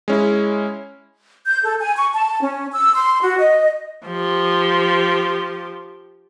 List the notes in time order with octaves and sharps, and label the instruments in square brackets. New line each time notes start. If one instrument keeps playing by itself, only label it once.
[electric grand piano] G#3 C#4 E4
[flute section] G6
A4
G#5
C#6
A5
C#4
E6
C6
F#4
D#5
[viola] F3 G4